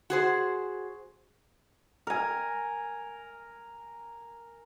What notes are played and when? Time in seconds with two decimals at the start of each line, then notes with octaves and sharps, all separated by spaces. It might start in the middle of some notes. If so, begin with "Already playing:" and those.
0.10 F#4 G#4 C5
2.07 A#4 G#5